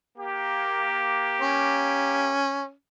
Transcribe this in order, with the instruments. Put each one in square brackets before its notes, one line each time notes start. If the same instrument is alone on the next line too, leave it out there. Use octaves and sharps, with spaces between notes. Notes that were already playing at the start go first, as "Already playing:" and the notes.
[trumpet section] A#3 G4
[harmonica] C#4